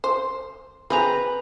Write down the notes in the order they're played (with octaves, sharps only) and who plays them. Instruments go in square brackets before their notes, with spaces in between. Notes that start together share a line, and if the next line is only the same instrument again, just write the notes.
[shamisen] C5
[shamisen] C4 G#4 [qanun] B4 A#5